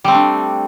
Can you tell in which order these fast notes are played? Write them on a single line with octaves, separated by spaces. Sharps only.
G3 C4 A3 D4